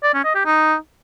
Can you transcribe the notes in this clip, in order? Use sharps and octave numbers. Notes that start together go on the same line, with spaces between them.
D5
C#4
D#5
G4
D#4